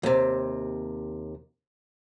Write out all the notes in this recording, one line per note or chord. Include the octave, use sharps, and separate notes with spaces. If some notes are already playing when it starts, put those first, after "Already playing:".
D#2 C3